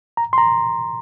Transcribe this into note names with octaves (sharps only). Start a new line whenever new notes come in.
A#5
C6
A#5